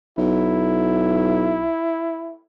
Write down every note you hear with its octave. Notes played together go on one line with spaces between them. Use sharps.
B1 E4